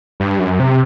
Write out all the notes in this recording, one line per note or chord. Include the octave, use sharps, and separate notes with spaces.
G2
F#2
C3